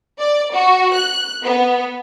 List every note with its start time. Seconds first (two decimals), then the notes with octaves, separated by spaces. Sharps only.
0.20 D5
0.54 F#4
0.93 F#6
1.44 B3